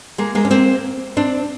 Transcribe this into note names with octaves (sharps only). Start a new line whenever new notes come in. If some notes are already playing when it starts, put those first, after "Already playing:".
G#3 A#3
G#3 A#3
C#4
A#3 C4
C4 D4